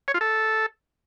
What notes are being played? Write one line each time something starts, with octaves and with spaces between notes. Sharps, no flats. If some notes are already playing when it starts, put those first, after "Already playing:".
C#5
F4
A4